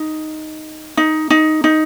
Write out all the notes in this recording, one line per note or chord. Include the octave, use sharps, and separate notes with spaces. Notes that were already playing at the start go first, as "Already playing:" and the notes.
Already playing: D#4
D#4
D#4
D#4